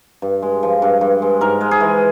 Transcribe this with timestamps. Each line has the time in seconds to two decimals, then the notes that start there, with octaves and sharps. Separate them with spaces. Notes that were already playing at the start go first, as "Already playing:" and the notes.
0.22 G2
0.42 G#3
0.63 F3
0.82 G2
1.01 G2
1.22 G#3
1.41 G#2 A#4
1.61 G#3
1.71 G#4
1.80 E3